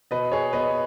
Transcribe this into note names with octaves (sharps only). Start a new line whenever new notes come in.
B2 B4 D#5
G#4 C#5
B3 B4 D#5